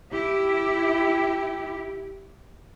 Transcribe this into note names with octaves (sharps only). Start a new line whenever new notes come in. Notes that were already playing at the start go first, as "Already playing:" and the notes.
E4 G4